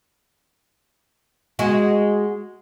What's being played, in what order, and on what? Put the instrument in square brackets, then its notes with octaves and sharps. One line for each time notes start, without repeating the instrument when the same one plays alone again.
[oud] G#3 F#4